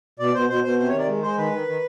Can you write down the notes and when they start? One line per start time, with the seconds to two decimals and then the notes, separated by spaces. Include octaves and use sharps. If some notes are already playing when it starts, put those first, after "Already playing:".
0.19 B2 D5
0.34 B2 C5
0.49 B2 C5
0.64 B2 C5
0.79 C3 C5
0.88 C#5
0.93 D#3
0.98 D5
1.08 G#3
1.23 G#3 C5
1.38 D#3 B4
1.53 D#3
1.68 D#3